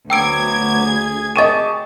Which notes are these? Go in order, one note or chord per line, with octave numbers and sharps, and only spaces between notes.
D2 F#3 B3 G5 D6 E6 G#6 D7
G#4 G#5
G4 G#4 D#5 A5 C#6 A6 D#7 E7